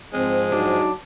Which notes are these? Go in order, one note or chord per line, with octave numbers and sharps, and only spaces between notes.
G#2 F3 G#3 C4
F#3 D4 D#4 F#4